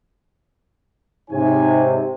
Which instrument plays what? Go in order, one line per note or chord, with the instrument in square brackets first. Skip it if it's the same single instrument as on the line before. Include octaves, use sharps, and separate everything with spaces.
[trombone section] G#2 C3 [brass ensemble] D#4 C#5 G#5